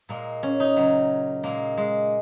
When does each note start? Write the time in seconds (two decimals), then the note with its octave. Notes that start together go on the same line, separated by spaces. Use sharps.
0.09 A#2 G#3 A#3
0.43 C#4
0.60 D#4
0.76 C#3 F#3
1.44 A#2 G#3 A#3
1.77 G#3